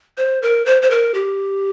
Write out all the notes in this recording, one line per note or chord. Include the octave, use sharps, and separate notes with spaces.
C5
A#4
C5
C5
A#4
G4